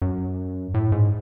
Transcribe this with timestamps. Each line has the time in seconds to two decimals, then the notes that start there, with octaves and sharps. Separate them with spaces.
0.02 F#2
0.74 A2
0.92 G#2